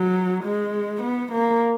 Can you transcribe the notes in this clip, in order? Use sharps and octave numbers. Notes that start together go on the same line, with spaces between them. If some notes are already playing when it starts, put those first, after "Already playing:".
Already playing: F#3
G#3
B3
A#3